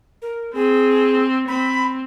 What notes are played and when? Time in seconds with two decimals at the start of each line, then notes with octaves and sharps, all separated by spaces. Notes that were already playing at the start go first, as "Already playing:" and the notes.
0.22 A#4
0.54 C4 G#4
1.48 C4 B5